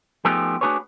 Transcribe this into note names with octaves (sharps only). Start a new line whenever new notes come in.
F3 A3 B3 D#4 G4 G#4
A3 D4 F#4 G#4 B4 C#5